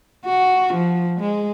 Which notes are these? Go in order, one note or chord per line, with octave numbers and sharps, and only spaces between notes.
F#4
F3
G#3